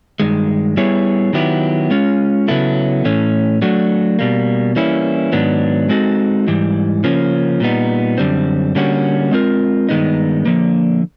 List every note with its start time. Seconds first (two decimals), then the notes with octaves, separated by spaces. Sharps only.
0.20 G2 D#3 G#3
0.77 G3 B3 E4 G#4 C#5
1.33 D#3 F#3 B3 E4 G4
1.91 G#3 C#4 F4
2.48 C#3 F#3 B3 E4 A4
3.05 A2 E3 A3 C#4
3.62 F#3 A3 D4 F#4
4.19 B2 G3 A#3
4.76 E3 G3 A#3 C#4 E4
5.32 G#2 D#3 F#3 B3 D4
5.89 G#3 C4 D#4 F#4 A4
6.47 G#2 E3 G3
7.04 C#3 F3 A#3 C#4
7.60 A#2 G3 B3 D#4
8.18 F#2 D3 G3 C4
8.75 D3 G3 A#3 C#4 F#4
9.31 G#3 C4 F4 A#4
9.89 G2 D#3 G#3 B3 D#4
10.45 D3 F3 A#3